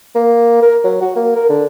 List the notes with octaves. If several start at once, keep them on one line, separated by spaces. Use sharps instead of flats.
A#3
A#4
F#3
F#4
A#3
A#4
D3